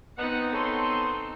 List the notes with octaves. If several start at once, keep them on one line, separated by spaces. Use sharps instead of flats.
B3 C4 D#4 F#5
B3 A4 C#5 C6